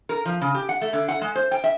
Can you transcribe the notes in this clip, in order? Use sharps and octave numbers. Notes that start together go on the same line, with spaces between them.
A#4
F3
C#3
G4
F#5
A3
D3
F#5
G#3
C5
G5
E5